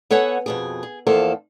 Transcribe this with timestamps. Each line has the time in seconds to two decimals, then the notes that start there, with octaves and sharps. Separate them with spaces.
0.11 B3 A4 C#5 F#5 G#5
0.46 F2 B2 G#4
0.83 G#4
1.07 E2 F3 A#3 A4 C5 F5